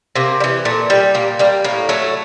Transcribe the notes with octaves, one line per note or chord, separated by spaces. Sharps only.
C3 A#3
G3
E3
A#2 A3
G3
A#2 A#3
G3 A#3
A2 A#3
F#3 A3